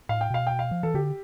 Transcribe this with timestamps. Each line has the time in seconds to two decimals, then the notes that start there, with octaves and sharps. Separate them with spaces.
0.09 A2 F5
0.21 G5
0.30 B2 F5
0.47 G5
0.59 F5
0.71 F3
0.83 E3 A4
0.94 D3 G4